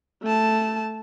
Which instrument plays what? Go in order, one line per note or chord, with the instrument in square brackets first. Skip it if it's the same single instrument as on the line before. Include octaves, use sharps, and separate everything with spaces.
[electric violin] A3 A5